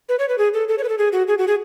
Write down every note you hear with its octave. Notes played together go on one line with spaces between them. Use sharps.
B4
C#5
B4
G#4
A4
A4
C#5
B4
A4
G#4
F#4
G#4
F#4
G#4